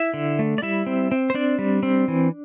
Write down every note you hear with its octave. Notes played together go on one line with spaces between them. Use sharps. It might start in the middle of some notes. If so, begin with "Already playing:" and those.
Already playing: E4 E5
D3
A3
D5
G3 E4 E5
C4
C4
C5
C4 D4 D5
G3
C4
E3